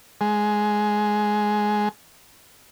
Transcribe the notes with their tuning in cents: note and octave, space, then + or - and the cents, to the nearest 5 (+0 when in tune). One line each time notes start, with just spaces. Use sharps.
G#3 +10